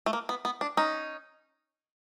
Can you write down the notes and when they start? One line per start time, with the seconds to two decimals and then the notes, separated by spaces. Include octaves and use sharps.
0.06 A3
0.13 A#3
0.29 B3
0.45 B3
0.61 D4
0.77 C#4 D#4